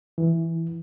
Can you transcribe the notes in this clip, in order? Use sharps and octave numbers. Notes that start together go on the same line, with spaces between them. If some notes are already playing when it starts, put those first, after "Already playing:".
E3